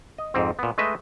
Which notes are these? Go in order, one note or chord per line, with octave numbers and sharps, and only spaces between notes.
D#5
F2 G#2 C4
A#2 B3
G#3 A3 B4 D#5 E5